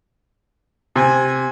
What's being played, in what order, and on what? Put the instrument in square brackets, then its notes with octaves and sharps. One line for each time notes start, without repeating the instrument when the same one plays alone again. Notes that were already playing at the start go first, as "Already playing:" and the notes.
[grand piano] C3 [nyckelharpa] G#5